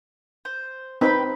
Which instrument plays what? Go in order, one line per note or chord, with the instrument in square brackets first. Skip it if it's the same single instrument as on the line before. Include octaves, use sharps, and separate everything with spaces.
[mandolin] C5
[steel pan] C4 D#4 [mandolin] B4 G5 B5